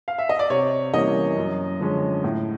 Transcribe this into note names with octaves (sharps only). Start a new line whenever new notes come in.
F5
E5
D#5
D5
C3 C#5
E3 G3 A#3 C#4 D#5
F#2
D3 F3 G#3 C#4
A2